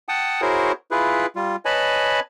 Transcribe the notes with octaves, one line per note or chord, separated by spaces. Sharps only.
F#5 G5 A5 D#6
E4 F#4 G#4 A#4 C5 C#5
E4 F4 G#4 B4
G3 F4
B4 C#5 D#5 G#5 A5 B5